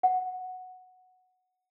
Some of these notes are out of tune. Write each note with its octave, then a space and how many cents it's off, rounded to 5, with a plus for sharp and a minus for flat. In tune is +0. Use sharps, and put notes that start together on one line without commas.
F#5 -5